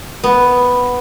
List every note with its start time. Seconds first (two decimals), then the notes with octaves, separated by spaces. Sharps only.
0.24 B3